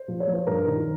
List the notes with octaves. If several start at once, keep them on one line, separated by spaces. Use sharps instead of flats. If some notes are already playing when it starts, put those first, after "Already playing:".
Already playing: C5
F3
C#5
F3
C5
G2 A#4
D#3